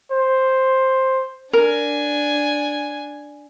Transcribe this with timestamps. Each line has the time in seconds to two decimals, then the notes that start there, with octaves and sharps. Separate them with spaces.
0.11 C5
1.53 D4 A#4 G#5